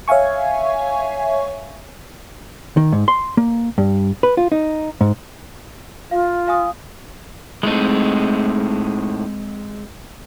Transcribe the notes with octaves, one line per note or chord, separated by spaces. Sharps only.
C#5 E5 F5 G#5 C#6
D#3
G#2
C6
A#3
G2
B4
F4
D#4
G#2
F4 F5
F5 G#5 D#6
A2 G#3 A3 C4 D#4